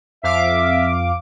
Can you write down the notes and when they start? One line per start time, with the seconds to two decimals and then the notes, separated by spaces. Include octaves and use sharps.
0.23 F2 E5 F5 D6